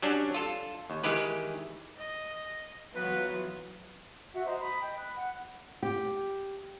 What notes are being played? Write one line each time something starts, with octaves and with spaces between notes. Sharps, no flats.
F#3 G3 C#4 D4
F4 A4
D#2
D#3 E3 G#3 G4 B4
D#5
E3 F#3 B3 F4 B4
F#4 E5 F#5
C5 D#5 A#5 C6
B5 D#6
D#5 G5
B5 F#6
F#5
G4